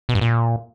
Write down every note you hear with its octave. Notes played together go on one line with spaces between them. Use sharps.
B2
G2
A#2